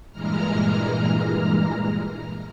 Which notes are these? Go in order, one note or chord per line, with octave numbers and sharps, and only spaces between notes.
G2 A#2 E3 G#3 A#5 F6